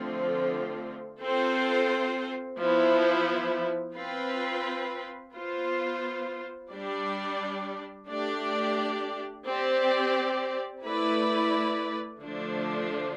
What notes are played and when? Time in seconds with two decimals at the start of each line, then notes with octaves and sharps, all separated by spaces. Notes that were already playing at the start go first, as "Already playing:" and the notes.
Already playing: D3 F3 A3 C4 F4
1.20 C4 F4 A4 C5
2.57 F3 B3 E4
3.95 C4 F4 B4
5.33 B3 F4 C5
6.70 G3 D4 G4 D5
8.08 A3 D4 G4 D5
9.46 C4 G4 D5
10.83 A3 E4 B4 D5
12.21 D3 F3 A3 D4